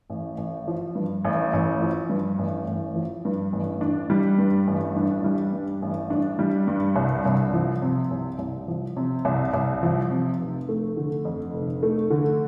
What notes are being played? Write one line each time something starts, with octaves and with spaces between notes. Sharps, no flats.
A1
A1
F3
G2
A1
A1
F3
G2
A1
A1
F3
G2
A1
D4
G3
G2
A1
D4
G3
G2
A1
D4
G3
G2
C2
C2
F3
C3
C2
C2
F3
C3
C2
C2
F3
C3
F1
A3
D3
F2
F1
A3
D3